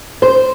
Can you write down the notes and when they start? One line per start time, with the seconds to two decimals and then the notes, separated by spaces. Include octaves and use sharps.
0.22 C5